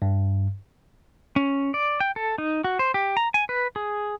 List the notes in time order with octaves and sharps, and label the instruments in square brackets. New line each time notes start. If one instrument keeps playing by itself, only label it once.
[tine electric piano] G2
[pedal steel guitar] C#4
D5
G5
A4
D#4
F#4
C5
G4
A#5
G#5
B4
G#4